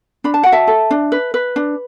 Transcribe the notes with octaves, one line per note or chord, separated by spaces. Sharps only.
D4 B5
A5
F#4 F#5
E5 A5
A4
D4
B4
B4
D4